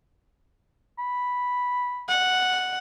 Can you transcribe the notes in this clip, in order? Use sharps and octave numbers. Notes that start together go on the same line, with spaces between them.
B5
F#5